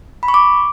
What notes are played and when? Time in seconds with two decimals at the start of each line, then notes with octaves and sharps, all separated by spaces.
0.23 B5
0.28 C#6
0.34 D6